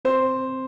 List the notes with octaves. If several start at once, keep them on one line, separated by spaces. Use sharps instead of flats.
C4 C5